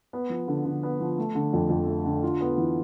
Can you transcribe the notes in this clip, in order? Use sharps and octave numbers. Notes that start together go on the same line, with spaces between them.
B3
F3
D3
D3
B3
F3
A3
D3
F2
F2
A3
D3
F4
B3
E3